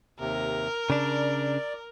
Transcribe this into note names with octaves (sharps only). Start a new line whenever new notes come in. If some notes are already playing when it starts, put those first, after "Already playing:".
D#2 C3 A#4
C#3 D4 D5